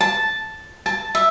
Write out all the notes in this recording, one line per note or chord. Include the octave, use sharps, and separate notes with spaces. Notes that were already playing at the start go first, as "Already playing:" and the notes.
A5
A5
E5